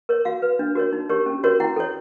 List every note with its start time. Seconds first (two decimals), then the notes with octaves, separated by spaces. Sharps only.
0.09 A#4 C#5
0.25 F#4 F5
0.42 B4
0.59 D4
0.75 F#4 A#4 C#5
0.93 D#4
1.09 G4 A#4 C#5
1.26 C#4
1.44 F#4 A#4 C#5
1.60 E4 G5
1.76 A4 C#5